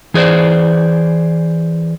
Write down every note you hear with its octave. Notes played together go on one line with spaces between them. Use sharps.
E3 G#4 C5 D5